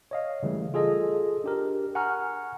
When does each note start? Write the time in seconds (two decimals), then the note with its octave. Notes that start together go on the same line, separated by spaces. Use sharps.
0.11 C#5 D#5 F5
0.43 C#3 E3 G3 A3
0.74 F4 G#4 A4 D#5
1.44 D4 G4 A#4
1.95 F#5 G#5 A#5 C#6 F6